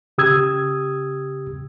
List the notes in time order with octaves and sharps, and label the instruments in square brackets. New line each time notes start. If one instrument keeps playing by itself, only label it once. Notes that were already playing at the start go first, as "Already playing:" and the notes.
[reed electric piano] C#3 G4 D#6 E6 G#6